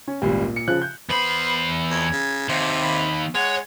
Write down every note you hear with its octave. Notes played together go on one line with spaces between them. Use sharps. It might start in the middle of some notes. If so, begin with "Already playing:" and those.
C#4
G#1 C#2 A#2 G3
C#7
C#3 F3 F#6
G6
E2 B3 C5 B5
F2 G#6
C#3
D#2 C3
B5
G#3 C#5 F#5